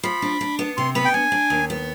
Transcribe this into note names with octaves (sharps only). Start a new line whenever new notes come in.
F3 B5
D4
D4
B3
C3 C6
B3 B5
G5
D4 G#5
D4
D#2
B3